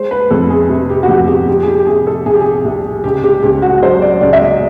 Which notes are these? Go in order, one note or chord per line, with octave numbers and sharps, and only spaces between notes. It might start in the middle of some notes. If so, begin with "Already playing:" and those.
Already playing: G#3 C5
B4
F2 A4
G#4
C3
G4
F#4
F2 G4
G4
F3 G4
G#4
G4
G4
C3 G#4
A4
C2 G#4
G4
G#4
C2
C#2 G4
G4
C#2 G4
F#4
F#3 C5
D5
C#2 D5
E5
D#5